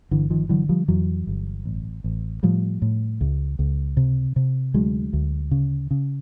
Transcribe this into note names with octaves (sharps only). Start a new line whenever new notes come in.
G1 D3 E3
D#3 F3
D3 E3 F#3
F3 G3
F2 E3 F#3
G1
A1
A1
A2 F3 G3
A2
C#2
C#2
C3
C3
D2 F#3 G#3
D2
C#3
C#3